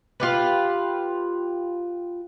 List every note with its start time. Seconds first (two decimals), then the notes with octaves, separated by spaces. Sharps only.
0.20 F4 G4 B4